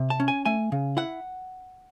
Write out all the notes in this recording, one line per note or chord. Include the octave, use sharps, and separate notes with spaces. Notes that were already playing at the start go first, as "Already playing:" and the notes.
Already playing: C3
A5
C#4
G#5
A3 G#5
C#3
E4 F#5